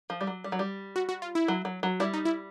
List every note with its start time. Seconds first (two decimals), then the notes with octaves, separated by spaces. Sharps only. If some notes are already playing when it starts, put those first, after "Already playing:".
0.10 F3
0.21 G3
0.27 F#3
0.44 G3
0.52 F#3
0.59 G3
0.96 F#4
1.09 F#4
1.22 F4
1.35 E4
1.48 F#3
1.65 F#3
1.83 F#3
2.00 G3 E4
2.14 D#4
2.25 E4